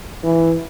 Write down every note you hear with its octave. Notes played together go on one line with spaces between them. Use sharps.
E3